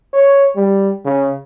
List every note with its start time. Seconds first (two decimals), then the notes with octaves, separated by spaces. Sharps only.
0.14 C#5
0.56 G3
1.05 C#3